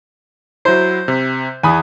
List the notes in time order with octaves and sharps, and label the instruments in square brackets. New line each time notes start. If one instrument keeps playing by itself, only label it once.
[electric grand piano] F#3 E4 [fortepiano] C5
[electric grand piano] C3
[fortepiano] E2 [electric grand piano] G#5 B5 D#6